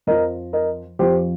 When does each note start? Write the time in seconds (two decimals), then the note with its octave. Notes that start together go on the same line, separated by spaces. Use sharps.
0.07 F2 F3 A#4 D#5
0.53 A#4 D#5
0.99 F2 F3 G4 C5